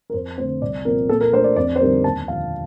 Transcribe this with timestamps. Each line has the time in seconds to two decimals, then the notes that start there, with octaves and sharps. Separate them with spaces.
0.10 A#4
0.13 F2 C5
0.38 D3 A3 C4 C5
0.61 C2 D5
0.85 A#2 F3 C4 A#4
1.09 A#2 A4
1.21 A#4
1.33 A3 D4 C5
1.44 D5
1.56 F2 D5
1.76 C5
1.80 D3 G3 C4 D#4 A#4
2.04 D#2 A5
2.27 D3 F3 F5